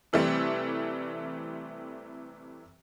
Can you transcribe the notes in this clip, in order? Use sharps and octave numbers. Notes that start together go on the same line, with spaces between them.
C3 E3 G3 A3 C4